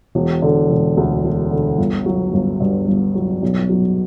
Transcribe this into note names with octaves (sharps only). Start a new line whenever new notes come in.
E1
D3
E1
D2
E1
D3
G1
F#3
G1
G2
G1
F#3
B1
F#3